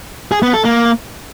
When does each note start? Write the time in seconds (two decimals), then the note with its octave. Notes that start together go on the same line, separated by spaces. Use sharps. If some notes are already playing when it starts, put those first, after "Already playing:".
0.32 G#4
0.43 B3
0.54 A4
0.64 A#3